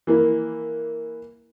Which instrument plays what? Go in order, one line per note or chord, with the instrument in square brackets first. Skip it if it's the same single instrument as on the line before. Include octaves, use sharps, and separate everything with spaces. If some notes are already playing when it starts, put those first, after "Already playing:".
[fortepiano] E3 A#3 E4